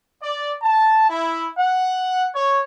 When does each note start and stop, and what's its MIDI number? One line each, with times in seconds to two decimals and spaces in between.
0.22 0.53 74
0.62 1.08 81
1.09 1.48 64
1.58 2.27 78
2.34 2.61 73